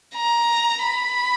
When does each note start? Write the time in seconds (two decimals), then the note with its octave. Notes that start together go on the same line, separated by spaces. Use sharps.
0.15 A#5
0.83 B5